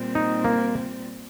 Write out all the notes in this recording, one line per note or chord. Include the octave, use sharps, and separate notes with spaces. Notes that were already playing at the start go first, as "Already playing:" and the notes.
Already playing: A#2 G3 C4
D#4
A#3